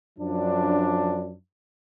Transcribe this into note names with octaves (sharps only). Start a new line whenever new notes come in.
F#2 F3 D4